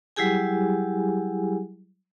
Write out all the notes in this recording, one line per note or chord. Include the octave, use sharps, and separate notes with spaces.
F#3 G3 E4 G4 G#4 G#5